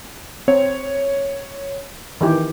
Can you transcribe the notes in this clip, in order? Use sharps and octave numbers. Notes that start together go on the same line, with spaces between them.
C4 C#5
D#3 E3 G4